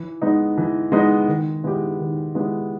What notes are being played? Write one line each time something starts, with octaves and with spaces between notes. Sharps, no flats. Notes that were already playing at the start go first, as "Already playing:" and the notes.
Already playing: E3
G#3 B3 D#4
E3
G#3 B3 D#4
D#3
G#3 B3 E4 G4
D#3
G#3 B3 E4 G4